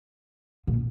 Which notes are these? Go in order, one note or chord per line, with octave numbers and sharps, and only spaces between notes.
A#2